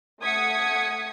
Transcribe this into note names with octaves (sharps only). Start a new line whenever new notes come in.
A3 F#5 D#6 G#6 B6 C#7